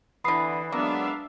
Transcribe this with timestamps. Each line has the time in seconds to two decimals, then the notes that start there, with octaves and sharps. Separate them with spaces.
0.24 D3 E3 B3 B5 D#6 C7
0.72 F#3 G#3 A#3 B3 D4 E5 F5